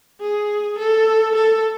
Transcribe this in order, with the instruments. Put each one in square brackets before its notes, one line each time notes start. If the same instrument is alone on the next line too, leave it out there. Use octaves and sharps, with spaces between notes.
[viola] G#4
A4
A4